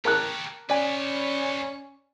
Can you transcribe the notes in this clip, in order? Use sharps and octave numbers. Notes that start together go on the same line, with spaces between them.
G4 A#4 C#5 A5 F#6
C#4 B4 C#5 D5 G#5